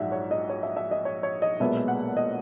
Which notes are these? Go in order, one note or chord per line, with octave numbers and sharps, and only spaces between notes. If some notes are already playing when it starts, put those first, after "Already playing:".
Already playing: A#1 G#2 F#3 E5 F#5
C#5
D#5
C#5
E5
E5
D#5
C#5
C#5
D#5
B1 A#2 G#3 B3 E5
F#5
D#5